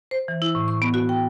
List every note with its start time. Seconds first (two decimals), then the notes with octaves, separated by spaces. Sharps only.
0.11 C5
0.28 E3
0.42 E4
0.55 A2
0.68 C#6
0.82 B3
0.94 F#4
1.09 G5